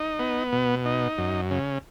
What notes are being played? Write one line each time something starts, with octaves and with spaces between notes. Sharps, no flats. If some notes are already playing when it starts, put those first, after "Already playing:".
Already playing: D#4
B3
B2
D#4
F#2
C#3